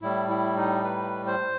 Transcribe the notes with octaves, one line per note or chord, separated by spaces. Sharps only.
A2 G3 E4
E4
D#4
B4
C5